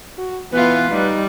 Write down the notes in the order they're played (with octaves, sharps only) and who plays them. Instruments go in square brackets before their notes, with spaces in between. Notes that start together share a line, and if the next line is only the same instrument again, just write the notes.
[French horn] F#4
[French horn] E3 [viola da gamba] B3 F4 [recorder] B4
[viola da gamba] G3 [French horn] D#4